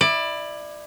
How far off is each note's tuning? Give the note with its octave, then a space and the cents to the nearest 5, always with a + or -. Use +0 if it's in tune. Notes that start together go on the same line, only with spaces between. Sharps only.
E4 +0 D5 +20